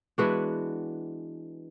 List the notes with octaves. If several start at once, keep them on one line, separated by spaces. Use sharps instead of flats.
E3 G#3 B3 D4 F#4